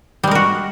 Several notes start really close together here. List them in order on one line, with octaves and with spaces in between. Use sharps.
G3 G#3 A#4 F#4